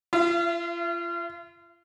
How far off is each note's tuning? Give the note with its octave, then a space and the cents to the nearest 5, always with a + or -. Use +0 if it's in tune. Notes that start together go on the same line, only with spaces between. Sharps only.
F4 -35 E5 +35